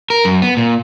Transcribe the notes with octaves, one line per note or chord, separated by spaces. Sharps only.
A#4
F#2
B3
A#2